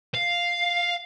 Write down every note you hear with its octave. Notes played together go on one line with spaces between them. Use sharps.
F5